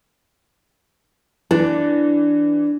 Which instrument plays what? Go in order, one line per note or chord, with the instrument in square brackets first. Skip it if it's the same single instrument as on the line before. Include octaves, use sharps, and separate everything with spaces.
[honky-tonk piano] E3 [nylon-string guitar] D4